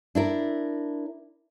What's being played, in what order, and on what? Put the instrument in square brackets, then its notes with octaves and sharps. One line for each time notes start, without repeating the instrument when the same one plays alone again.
[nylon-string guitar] D4 E4 A#4